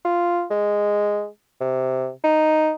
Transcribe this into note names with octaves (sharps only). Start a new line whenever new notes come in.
F4
G#3
C3
D#4